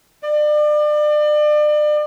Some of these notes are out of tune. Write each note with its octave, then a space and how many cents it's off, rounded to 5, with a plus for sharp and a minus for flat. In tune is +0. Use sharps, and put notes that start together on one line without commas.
D5 +35